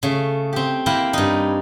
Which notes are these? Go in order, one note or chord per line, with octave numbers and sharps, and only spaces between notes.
C#3 A3
C4 G4
A#3 E4 A#4 G5
G2 D#4